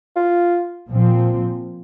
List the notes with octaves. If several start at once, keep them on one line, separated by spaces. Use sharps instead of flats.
F4
A#2 F3 C4